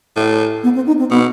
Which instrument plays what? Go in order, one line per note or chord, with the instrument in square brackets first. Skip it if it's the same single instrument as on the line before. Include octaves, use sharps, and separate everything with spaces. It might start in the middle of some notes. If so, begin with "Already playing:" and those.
[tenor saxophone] A2
[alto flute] B3
C4
D#4
C4
[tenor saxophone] B2 [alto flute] B3